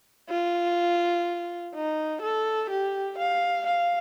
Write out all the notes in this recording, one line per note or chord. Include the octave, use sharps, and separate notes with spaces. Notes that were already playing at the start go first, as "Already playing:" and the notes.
F4
D#4
A4
G4
F5
F5